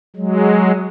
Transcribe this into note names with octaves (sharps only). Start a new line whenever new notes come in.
F#3 G#3